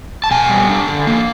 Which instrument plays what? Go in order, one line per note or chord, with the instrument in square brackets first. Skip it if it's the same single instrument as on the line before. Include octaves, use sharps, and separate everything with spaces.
[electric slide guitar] A5
B2 G#5
G3
D4
D3
A#3